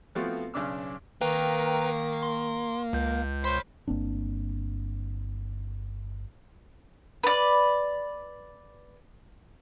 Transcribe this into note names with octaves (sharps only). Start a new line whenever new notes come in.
F3 A3 B3 C4 F4 F#4
B1 C#3 C#4 D4 D6 E6
D#3 A#3 B4 G5 A#5
C6
C#2 G6
C5 C#5 B5
G1 A#3 C4 D4
B4 D5